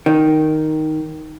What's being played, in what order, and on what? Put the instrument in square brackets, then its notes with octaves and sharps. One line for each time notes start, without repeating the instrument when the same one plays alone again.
[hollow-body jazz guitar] D#3